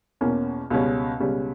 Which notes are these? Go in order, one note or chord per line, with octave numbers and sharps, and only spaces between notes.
E2 B2 A#3 C#4
C#2 B2 G3 C#4
C#2 B2 G3 C#4